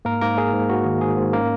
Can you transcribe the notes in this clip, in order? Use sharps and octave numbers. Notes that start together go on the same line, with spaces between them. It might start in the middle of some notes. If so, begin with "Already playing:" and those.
G#2 A#3 A#4
G#2 A#3 A#4
A#3 G#4
G#2
G#2 F#4
D#3
G#2 G#4
G#2
A#3 C#4 A#4